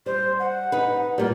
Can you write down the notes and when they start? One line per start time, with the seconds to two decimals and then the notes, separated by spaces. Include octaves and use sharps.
0.06 G3 C5
0.39 F#5
0.72 D#4 B4
1.18 A#2 G3 A#4